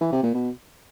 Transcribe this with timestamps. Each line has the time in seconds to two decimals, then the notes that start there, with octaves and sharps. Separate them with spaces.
0.01 E3
0.12 C3
0.23 A#2
0.34 B2